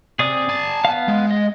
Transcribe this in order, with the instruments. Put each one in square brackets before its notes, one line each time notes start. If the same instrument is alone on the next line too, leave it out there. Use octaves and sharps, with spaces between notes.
[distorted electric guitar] C3 [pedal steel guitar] G#4 D5 D#6
[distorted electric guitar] G#5 A5
[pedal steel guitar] B3 F5
[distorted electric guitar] G#3
[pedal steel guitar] D#5